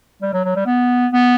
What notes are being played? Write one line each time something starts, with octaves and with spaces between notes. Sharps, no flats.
G3
F#3
F#3
G3
B3
B3